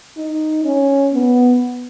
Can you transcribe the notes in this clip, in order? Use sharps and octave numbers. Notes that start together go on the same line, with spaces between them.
D#4
C#4
B3